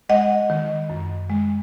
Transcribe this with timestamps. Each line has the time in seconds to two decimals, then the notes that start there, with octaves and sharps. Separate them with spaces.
0.09 G#3 D#5 F#5
0.50 D#3
0.90 F#2
1.30 G#3